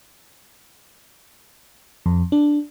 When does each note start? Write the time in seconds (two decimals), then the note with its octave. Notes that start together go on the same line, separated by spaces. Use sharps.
2.06 F2
2.32 D4